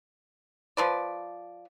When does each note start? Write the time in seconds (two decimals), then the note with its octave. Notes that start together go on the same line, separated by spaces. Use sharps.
0.77 F3 B4 D5